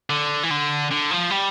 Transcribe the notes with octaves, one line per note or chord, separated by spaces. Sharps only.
D3
E3
D3
D3
F3
G3